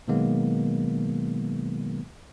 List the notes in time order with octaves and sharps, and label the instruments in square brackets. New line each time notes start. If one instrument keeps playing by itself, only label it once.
[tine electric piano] B2 D#3 F#3 G#3 A#3 B3